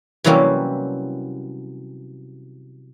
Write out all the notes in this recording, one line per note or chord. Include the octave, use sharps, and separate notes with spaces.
C3 E3 F#3 G3 A#3 C#4